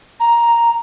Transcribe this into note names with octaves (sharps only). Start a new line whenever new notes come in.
A#5